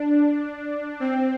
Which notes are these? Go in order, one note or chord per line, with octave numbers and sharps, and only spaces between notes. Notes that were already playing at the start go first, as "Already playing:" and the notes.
Already playing: D4
C4